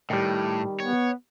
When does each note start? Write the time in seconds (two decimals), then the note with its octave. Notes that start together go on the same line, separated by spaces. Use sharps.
0.10 A2 D#3 G3
0.80 B3 C#5